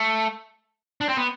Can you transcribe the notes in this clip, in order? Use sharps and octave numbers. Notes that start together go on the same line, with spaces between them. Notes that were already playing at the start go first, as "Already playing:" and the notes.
Already playing: A3
D4
C4
B3